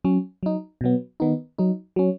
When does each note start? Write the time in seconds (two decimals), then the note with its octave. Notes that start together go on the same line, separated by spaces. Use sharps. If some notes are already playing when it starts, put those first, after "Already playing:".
0.05 F#3 C#4
0.43 F#3 D#4
0.81 B2 F#3 B3
1.20 D#3 B3 D#4
1.58 F#3 D#4
1.96 F#3 C#4